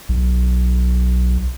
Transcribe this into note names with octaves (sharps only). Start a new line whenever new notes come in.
B1